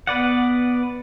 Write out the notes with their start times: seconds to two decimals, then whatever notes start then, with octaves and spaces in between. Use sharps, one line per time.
0.07 B3 B4 D5 F#5